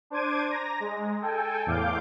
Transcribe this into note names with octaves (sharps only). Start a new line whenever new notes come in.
D4 C5 D6 G#6 D#7
A#5 A#6
G#3
A4 G5 G#5
E2 A2 F5 D6 G6